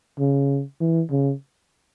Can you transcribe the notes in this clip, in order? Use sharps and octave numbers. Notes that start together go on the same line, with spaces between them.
C#3
E3
C#3